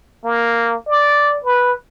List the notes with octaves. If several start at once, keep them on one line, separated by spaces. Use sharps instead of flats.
A#3
D5
B4